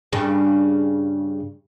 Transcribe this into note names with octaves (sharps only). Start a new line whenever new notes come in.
G2 C#3